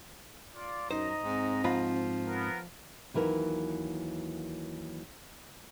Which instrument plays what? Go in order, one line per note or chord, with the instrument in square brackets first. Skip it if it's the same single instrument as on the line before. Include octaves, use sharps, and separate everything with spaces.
[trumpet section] F4 D5
[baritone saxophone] F#2 [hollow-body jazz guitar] D#4 C5 [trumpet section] D#5 A#5
[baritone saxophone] G#2 [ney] C4
[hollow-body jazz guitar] G#2 F4 B5 [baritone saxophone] F3
[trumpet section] B3 A#4
[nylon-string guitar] D#2 E3 F#3 A#4